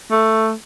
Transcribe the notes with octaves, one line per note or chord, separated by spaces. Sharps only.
A3